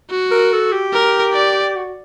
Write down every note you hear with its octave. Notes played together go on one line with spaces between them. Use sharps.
F#4
A#4
A4
G4
A#4
D5
F#4